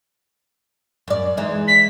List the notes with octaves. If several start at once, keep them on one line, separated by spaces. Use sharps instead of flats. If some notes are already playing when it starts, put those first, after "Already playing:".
F#2 D5
E3 G#3 D#4
B6